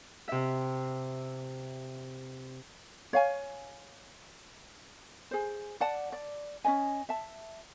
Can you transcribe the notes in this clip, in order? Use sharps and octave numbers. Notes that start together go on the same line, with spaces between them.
C3 E5
C#5 F5 G#5
G#4 C5
D5 F#5 A5
D5
C#4 D#4 D#5 G#5
E5 A5